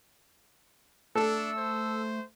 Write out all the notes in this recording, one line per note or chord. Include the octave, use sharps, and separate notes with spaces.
A3 D4 A4 E6
C5